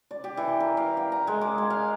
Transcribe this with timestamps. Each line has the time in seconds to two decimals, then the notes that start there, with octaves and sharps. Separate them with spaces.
0.11 D5
0.24 G4
0.37 E3
0.60 A#4
0.77 F5
0.97 G5
1.12 A#5
1.27 G#3
1.42 D6
1.58 G#5
1.70 F5